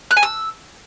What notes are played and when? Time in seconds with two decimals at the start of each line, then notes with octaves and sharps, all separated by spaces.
0.11 F#6
0.17 G#5
0.23 E6